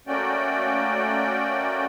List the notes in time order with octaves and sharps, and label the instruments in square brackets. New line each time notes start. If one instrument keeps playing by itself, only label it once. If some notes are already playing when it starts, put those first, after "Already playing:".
[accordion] A3 A#3 C#4 F#4 D5 G5